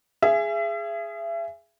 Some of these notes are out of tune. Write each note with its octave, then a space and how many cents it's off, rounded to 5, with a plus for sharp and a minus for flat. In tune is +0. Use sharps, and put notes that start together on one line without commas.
G#4 +0 E5 +35